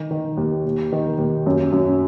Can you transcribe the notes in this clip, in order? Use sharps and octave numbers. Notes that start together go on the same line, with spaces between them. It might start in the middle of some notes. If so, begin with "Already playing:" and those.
Already playing: D#3
D#3
D#2
D#2
D#3
D#2
F#2
F#2